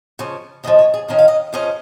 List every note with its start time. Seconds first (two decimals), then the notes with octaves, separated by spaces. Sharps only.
0.19 C#3 F3 C#4
0.64 D#2 C#3 F3 D#5
0.79 C#5
0.94 G#4
1.08 F2 D#3 C#4 D#5
1.19 F5
1.28 D#5
1.53 F2 C#3 F3 C#4 D#5